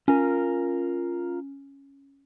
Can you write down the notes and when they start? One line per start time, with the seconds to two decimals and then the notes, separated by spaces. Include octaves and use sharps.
0.08 C#4 F4 A#4